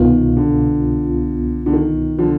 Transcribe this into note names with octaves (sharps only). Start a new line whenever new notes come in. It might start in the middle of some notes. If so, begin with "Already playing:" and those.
Already playing: C2 B2 D#3 B3 F4
D3
D3
D#3
D3 F3